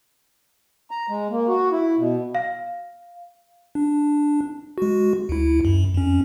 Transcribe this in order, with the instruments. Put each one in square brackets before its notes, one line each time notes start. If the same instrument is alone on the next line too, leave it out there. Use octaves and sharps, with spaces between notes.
[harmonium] A#5
G#3
A#3
F#4
E4
B2
[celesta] F5
[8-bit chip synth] D4
G#3 F#4
D2 E4
F#2
F2 C#4